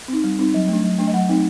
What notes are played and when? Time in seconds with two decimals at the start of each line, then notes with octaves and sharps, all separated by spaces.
0.08 C4 D#4
0.24 G3
0.39 C4 D#4
0.54 F#3
0.68 A3 D4
0.84 F#3
0.99 A3 D4
1.07 D#5
1.13 F#3 F#5
1.29 A3 C4 D#4